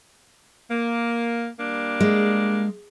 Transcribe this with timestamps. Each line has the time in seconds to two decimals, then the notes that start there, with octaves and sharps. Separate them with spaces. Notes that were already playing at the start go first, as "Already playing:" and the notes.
0.71 A#3
1.60 G3 A#3 D4
2.00 G#3